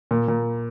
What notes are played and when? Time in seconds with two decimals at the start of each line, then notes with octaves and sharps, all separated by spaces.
0.11 A#2
0.28 A#2